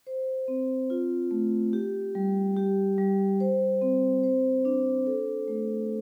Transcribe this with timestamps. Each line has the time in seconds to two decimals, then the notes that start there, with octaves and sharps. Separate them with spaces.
0.07 C5
0.48 C4
0.90 F4
1.31 A3
1.73 G4
2.15 G3
2.56 G4
2.98 G3
3.40 C5
3.81 C4
4.24 C5
4.65 D4
5.06 A4
5.48 A3